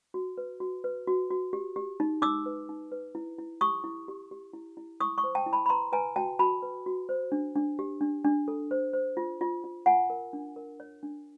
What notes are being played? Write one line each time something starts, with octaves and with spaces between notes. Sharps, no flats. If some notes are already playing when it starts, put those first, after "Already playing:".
F#4
B4
F#4
B4
F#4
F#4
G4
G4
D#4
D#4 D6 E6
B4
D#4
B4
E4
E4
G4 C#6 D#6
E4
G4
G4
E4
E4
E4 C#6 D#6
C#6 D#6
C5
G5 A5
E4
A5 B5
B5
B4 A#5 C6
B4 G#5 A#5
F#4 G5 A5
F#4 A5 B5
B4
F#4
C5
D4
D4
G4
D4
D4
A4
C5
C5
F4
F4
F4
F4 F#5 G#5
A#4
D4
A#4
C#5
D4